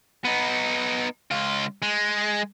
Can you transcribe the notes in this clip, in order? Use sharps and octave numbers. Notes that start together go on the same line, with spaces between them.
B3 D#4
C#2 F4
G#3